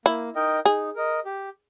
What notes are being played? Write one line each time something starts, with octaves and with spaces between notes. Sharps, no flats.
A#3 E4
D#4 A#4 D#5 G5
D#4 G#4
A#4 D#5
G4